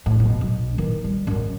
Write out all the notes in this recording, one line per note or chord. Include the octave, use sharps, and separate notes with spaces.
A2
F#2 B2
B1
D#3 E3
G3
F#2 G#3